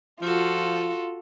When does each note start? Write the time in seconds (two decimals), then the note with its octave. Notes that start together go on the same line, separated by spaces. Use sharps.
0.22 F3 F4 F#4 A4